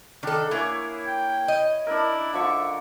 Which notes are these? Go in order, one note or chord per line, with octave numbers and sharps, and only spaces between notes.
D#3 D4 A4 F#5
A#3 E4 G#4 C#5
G5
D#5
D4 E4 A#4
D3 F3 E5 C#6